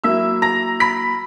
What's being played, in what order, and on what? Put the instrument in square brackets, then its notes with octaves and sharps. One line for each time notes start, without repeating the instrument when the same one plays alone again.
[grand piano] F#3 A#3 E4 [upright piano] E5 E6
[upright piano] A#5 A#6
B5 B6